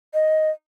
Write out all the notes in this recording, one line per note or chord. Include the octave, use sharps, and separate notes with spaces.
D#5